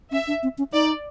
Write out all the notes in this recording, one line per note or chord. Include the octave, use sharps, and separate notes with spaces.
C#4 E5
D4
C4
C#4
D#4 D5